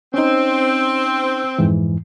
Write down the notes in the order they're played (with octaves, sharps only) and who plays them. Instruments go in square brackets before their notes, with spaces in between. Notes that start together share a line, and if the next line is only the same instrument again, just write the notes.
[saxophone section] C4 [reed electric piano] C#4 D#4
[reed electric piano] F2 G#2 E3